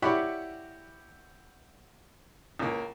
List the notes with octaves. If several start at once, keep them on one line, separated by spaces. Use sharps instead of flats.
E4 F#4 G4 C#5 D5 B5
C#2 A#3